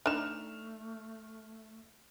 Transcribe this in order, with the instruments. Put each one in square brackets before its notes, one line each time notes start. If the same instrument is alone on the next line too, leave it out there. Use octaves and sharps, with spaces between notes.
[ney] A3 [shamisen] D4 D#4 [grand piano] F6 E7